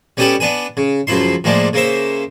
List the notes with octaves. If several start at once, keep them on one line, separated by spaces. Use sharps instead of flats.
G3 B3 C#4 G4 A4 B4
B3 D4 B4 G#5
C#3
C#2 F#2 F3 E4 C6
A2 F3 G#3 A#3 D4
C#3 A#3 C5 E5